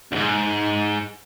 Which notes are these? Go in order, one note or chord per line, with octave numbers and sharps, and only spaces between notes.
D2 G#2